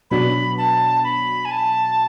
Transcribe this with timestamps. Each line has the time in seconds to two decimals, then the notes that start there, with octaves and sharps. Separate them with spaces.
0.11 B2 F#3 B3 D4 B5
0.58 A5
1.04 B5
1.45 G#5
1.51 A5